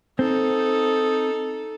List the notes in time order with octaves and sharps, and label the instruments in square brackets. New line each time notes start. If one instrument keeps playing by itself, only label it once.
[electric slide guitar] C4 [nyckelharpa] D#4 A4